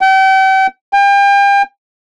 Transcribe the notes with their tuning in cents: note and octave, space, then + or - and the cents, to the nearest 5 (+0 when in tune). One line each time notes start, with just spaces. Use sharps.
G5 -40
G5 +35